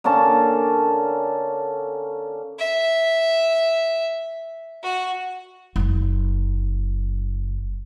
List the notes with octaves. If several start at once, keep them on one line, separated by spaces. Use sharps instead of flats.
D3 A#3 C#4 A5
E5
F#4
F#1 F#2